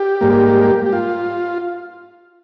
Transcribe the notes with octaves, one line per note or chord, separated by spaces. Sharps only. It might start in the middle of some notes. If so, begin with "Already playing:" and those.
Already playing: G4
G#2 G3 A#3
G4
F4